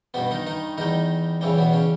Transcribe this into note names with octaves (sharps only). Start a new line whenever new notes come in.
G2 B2 G3 B3
D#3 D#4
D#3 D#4
E2 D#3 G3 D#4
E2 C#3 E3 G3
B2 B3
C#3 C#4